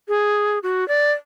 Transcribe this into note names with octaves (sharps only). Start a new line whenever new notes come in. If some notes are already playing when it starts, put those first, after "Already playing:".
G#4
F#4
D5